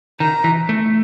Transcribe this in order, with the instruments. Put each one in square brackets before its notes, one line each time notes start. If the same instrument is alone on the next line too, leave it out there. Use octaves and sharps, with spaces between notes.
[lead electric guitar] D#3 [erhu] A#5
[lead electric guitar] E3
A3